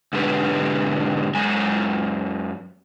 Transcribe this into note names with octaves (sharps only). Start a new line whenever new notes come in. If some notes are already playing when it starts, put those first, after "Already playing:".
G#2 B2 D3 G4 B4
F#2 G#3 G#5 A#5